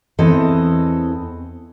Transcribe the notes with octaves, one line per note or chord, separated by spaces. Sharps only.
E2 E3 C4 A4 D#5